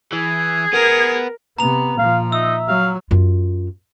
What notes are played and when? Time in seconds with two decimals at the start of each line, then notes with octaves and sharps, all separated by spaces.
0.12 E3 G#4
0.73 B3 A#4
1.58 C3 B3 A#5 F7
1.98 A#2 F3 F5
2.32 D#4 E5 E6
2.68 F#3 F5
3.11 F#2 F4